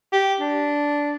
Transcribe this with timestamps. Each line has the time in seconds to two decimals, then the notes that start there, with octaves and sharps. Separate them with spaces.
0.13 G4
0.40 D4